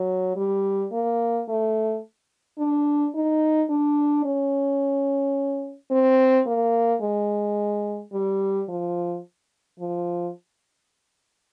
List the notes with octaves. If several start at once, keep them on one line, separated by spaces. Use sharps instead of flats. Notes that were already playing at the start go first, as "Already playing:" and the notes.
Already playing: F#3
G3
A#3
A3
D4
D#4
D4
C#4
C4
A#3
G#3
G3
F3
F3